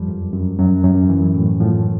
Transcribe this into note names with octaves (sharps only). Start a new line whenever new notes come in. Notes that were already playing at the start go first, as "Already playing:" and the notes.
Already playing: F2 F3 G3
F#2
F#2
F#2 F#3
F#2
E3
A2
A2 F3